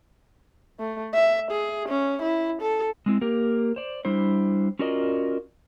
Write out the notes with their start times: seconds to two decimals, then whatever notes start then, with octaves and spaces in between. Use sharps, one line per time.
0.79 A3
1.14 E5
1.51 G#4
1.89 C#4
2.22 E4
2.62 A4
3.06 G#3 C4 E4
3.21 A#3 G4 A#4
3.76 C5 D5
4.05 G3 D4 E4 C5
4.79 C#4 F4 F#4 A#4 D5 D#5